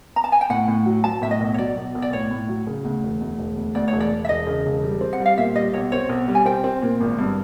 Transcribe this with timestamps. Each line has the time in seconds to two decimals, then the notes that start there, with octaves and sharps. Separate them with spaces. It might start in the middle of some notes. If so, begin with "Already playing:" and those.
0.16 A#5
0.24 A5
0.32 G#5
0.41 G5
0.50 A2 F#5
0.68 A2
0.86 F#3
1.04 F#3 A5
1.22 A2 E5
1.31 D#5
1.41 B1
1.54 C#5
1.58 F#3 D5
1.77 B1
1.95 B1
2.02 D5
2.13 A2 C#5
2.31 A2
2.49 F#3
2.67 C#3
2.85 D2
3.03 E1
3.21 D2
3.39 E1
3.56 D2
3.75 D2 D5
3.88 C#5
3.93 E1
4.00 D5
4.11 E1
4.25 E5
4.29 E1 D#5
4.47 C#3
4.66 E1
4.84 G3
5.01 C4
5.13 F#5
5.20 G3
5.26 F5
5.37 A#2 E5
5.55 G3 D#5
5.74 B1 C#5
5.92 C4 C#5
6.09 B1
6.28 G3
6.35 G#5
6.46 C4 G5
6.64 C4
6.82 A#2
7.00 G#1
7.19 G2